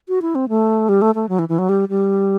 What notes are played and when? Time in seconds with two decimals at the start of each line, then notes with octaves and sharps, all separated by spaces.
0.08 F#4
0.22 E4
0.35 C4
0.49 A3
0.89 G3
1.02 A3
1.15 A3
1.29 F#3
1.39 E3
1.49 E3
1.59 F#3
1.69 G3
1.89 G3